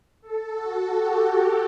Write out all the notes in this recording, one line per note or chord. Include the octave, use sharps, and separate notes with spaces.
A4
F#4
G4
A4